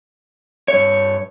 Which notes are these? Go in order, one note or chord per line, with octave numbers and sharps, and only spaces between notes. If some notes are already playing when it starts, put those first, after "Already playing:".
G2 C#5